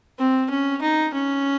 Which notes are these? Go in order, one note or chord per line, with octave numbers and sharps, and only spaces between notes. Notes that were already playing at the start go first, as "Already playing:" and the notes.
C4
C#4
D#4
C#4